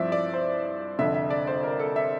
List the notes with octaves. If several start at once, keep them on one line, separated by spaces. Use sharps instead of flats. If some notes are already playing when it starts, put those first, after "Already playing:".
Already playing: G2 F3 C4 E4 D5 E5
D5
C5
F1 F2 D3 E5
E5
D5
C5
A#4
A4
E5